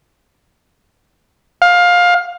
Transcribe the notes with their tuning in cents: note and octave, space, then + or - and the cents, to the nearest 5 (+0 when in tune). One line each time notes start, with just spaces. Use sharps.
F5 +20